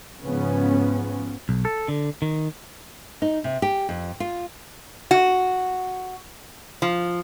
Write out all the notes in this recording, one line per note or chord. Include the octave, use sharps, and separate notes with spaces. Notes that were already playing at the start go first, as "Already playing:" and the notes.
G#2 C#3 F3 B3 C#4
B1
A4
D3
D#3
D#4
C3
G4
F2
F4
F#4
F3